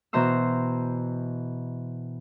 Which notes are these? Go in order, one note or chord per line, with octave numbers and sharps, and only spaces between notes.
B2 E3 C5 A#5 C6 E6